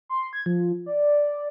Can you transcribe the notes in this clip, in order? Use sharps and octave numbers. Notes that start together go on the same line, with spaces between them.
C6
G#6
F3
D5